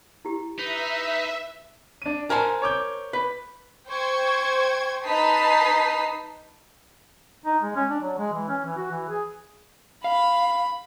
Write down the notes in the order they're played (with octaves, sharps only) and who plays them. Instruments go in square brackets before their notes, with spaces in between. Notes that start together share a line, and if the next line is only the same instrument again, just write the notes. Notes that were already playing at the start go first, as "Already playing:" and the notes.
[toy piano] E4 G4
[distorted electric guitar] D#4 [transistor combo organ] B4 [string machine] E5
[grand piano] D4 D#7
[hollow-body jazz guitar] A#4 C5 A5 [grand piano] G#5
[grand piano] C#5 D6 G6
[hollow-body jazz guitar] B4
[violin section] C5 G5 C#6 G#6
D#4 B4 A5 D#6 B6 C7
[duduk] D#4
G#3
C#4
D4
F#3
G#3
E3
C#4
E3
F#4
E3
G#4
[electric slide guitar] F5 [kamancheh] B5